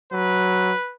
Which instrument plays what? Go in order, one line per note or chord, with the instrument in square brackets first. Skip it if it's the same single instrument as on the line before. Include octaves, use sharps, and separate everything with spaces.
[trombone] F#3 [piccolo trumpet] B4